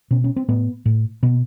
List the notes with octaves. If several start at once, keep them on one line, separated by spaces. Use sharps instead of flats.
B2 C#4
C#4
C4
A2 B3
A2
B2 B3